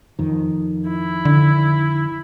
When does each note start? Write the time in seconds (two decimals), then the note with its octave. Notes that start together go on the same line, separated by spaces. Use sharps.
0.19 F2 D#3
0.89 E4
1.25 D3